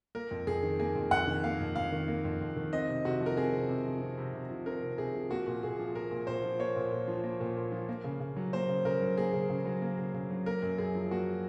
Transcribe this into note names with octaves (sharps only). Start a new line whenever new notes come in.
A#3 A#4
F2
F2 G#4
D#3
A#3 G#4
F2
F2 F#5
D#3
A#3 F5
F2
F2 F5
D#3
A#3
F2
F2
D#3
C4 D#5
C3
C3 F#4
F3
A#4
C4 G#4
C3
C3
F3
C4
C3
C3
F3
C4 A#4
C3
C3 G#4
F3
A#3 F#4
A#2
A#2 G#4
F3
A#3 A#4
A#2
A#2 C5
F3
A#3 C#5
A#2
A#2
F3
A#3
A#2
A#2
F3
A#3
C#3
C#3
F#3
A#3 C5
C#3
C#3 A#4
F#3
A#3 G#4
C#3
C#3
F#3
A#3
C#3
C#3
F#3
A#3 A#4
F#2
F#2 G#4
F3
A#3 F#4